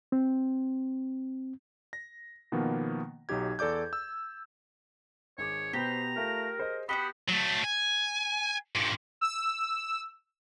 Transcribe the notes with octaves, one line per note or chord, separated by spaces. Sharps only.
C4
A#6
B2 D#3 F3 A#3 B3
B1 F#3 D#4 G4 G#6
E2 A4 D5 D6 G6
E6
G#1 G#4 C#5 D6
B2 B3 G4 C5 A#5
A3 F4 A#4
G#4 C5 D#5
B3 D#4 F#4 G4 B5 D#6
F#3 A3
G#5
G2 A#2
E6